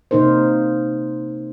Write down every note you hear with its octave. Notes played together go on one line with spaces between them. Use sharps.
C3 A#3 D#4 A#4 C5